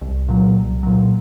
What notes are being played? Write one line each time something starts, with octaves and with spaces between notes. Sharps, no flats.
C2
A#2 F#3
C2
A#2 F#3